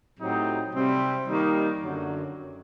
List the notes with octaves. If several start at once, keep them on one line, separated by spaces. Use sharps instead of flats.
A2 F#3 C4 D#4 G4
C3 G3 C4
D#3 G3 A#3 D#4
F#2 D3 F#3